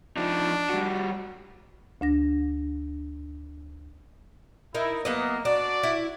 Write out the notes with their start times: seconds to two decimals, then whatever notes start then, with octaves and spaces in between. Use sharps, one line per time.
0.17 F3 D4 D#4
0.70 G3 F#4
2.01 D2 D4 A#6
4.75 D#4 E4 A#4
5.05 F#3 A#3 B3 D#5
5.45 D4 F#4 D5
5.83 E4